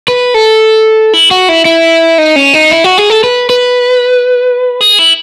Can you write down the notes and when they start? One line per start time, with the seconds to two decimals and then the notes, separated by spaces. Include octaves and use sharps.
0.08 B4
0.34 A4
1.13 E4
1.31 F#4
1.49 E4
1.65 E4
2.18 D#4
2.36 C#4
2.54 D#4
2.71 E4
2.84 F#4
2.98 G#4
3.10 A4
3.24 B4
3.50 B4
4.81 G#4
4.99 E4